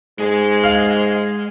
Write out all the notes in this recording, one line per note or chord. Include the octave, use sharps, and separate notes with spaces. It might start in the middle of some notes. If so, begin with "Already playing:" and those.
G#2 G#3 G#4
F5